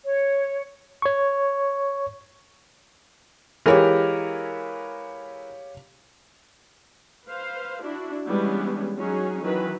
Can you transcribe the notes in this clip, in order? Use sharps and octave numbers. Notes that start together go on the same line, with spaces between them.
C#5
C#5 C#6
E3 G#3 G4 A#4 C#5 F5
B4 C5 F5
D4 E4 F#4
E3 G3 G#3 B3 C#4 D4
F#3 C#4 D#4 G#4
D#3 E3 F#3 B4